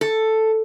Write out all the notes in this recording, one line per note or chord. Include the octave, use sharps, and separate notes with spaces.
A4